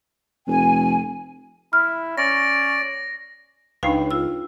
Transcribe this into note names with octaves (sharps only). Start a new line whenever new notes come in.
F1 G#5
E4 F6
C#4 D5 A#6
C#2 D4 D#4 B4 F5 G5
F4 E6